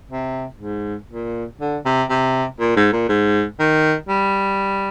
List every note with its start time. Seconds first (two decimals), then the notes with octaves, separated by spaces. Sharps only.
0.11 C3
0.60 G#2
1.10 A#2
1.61 D3
1.86 C3
2.10 C3
2.60 A#2
2.76 G#2
2.93 A#2
3.09 G#2
3.60 D#3
4.09 G3